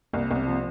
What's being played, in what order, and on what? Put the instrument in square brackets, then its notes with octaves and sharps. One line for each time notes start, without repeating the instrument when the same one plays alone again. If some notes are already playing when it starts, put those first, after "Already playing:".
[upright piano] C2 [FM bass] A#3
[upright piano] C2
[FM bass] C4
[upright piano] F3